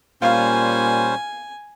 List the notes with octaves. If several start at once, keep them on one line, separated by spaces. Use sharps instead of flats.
A#2 G3 C#4 F4 C5 F5 G#5